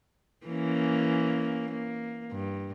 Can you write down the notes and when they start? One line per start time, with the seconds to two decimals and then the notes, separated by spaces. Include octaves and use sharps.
0.46 E3 A#3 C#4
1.71 A#3
2.31 G2